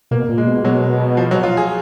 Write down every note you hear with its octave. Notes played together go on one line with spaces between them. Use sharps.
B2 A#3
A#2
G#3
B2
B2 F#3
F3
F#3
F4
G#4